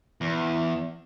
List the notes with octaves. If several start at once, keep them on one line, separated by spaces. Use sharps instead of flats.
E2